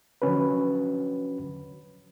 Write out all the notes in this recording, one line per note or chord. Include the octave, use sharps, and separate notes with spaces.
D3 F3 F#3 C#4 F#4 B4